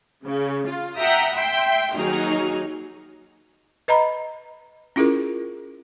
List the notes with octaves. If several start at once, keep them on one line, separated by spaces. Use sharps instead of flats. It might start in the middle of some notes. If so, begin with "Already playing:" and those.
C#3
F4
E5 F#5 G5 A#5 D#6
E5 G5 C6
D#2 F#3 D#4 G#4 F6
B4 D#5 A#5 B5
C#4 E4 F4 G#4 A#4